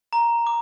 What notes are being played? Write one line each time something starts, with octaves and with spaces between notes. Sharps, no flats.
A#5
D6